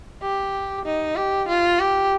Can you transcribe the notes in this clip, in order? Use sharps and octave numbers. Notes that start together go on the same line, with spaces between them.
G4
D#4
G4
F4
G4